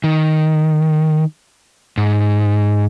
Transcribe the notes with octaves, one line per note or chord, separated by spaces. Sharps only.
D#3
G#2